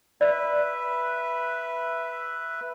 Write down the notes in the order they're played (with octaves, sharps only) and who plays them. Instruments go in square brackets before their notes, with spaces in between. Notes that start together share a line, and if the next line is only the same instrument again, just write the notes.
[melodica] B4 E5 [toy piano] D5